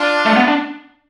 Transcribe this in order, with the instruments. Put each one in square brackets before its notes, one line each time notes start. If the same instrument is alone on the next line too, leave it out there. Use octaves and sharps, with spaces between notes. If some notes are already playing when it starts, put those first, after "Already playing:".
Already playing: [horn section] D4 F4
[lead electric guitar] A3
B3
D4